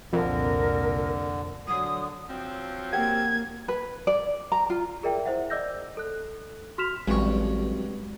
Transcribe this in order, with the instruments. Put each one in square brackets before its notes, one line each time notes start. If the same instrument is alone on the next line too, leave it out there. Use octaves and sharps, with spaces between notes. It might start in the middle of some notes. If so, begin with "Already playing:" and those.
[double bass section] C2 A#2 [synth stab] F2 [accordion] D3 [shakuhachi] A#4
[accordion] D3 [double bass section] F#3 [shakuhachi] D#6
[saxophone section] F3 F#3 C4
[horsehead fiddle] A#3 [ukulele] G4 F#5 [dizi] G#6
[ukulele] B4
D5
A#5
F4
[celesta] G#4 A#4 D5 E5 G5
E4 C5 E5 F#5
D5 D#5 D6 E6 G6 A#6
A4 F#6
F#4 C6 F6 B6 E7 F7
[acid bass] A1 [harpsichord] G2 C#6 [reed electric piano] F#3 C4 F#4 [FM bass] G#3